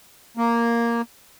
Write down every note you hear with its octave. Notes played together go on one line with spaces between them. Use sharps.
A#3